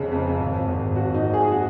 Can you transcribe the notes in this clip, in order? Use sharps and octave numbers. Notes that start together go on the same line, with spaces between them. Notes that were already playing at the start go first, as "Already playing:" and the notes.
Already playing: F1 F2 C#3
F2
G#1
G#1
G#1 F#4
D#4
G#1
G#4
F#4